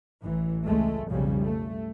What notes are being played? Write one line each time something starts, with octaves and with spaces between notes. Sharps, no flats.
A1 E3
C#2 G#3 A3
B1 F2 C#3 G3
A3